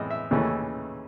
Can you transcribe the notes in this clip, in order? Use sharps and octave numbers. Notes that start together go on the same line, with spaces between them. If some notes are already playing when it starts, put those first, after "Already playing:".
Already playing: A2 E3 G#3 D#5
E5
D#2 C#3 E3 A3 C#4